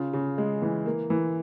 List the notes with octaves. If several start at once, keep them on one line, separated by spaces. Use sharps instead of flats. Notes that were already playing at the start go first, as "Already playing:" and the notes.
Already playing: C#3 F4
C#3
G#3
E3
A#3
E3